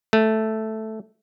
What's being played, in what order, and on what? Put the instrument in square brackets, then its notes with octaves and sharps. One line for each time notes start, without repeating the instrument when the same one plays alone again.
[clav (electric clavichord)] A3